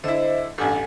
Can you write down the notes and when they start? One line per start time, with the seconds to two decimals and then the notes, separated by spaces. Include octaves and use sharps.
0.04 D3 E4 C5 D#5 E5
0.58 A1 G2 A4 F#5 G#5